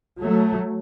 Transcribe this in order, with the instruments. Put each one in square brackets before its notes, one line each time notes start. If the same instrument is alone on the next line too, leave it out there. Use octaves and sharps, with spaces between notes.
[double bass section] F#3 A3